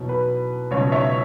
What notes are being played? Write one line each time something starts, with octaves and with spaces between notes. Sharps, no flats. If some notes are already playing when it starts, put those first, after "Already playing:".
Already playing: E2 B2 F#3
B4
C#2 B2 F#3 C#5
C#5 E5